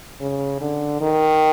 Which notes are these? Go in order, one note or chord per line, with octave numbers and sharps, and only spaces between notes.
C#3
D3
D#3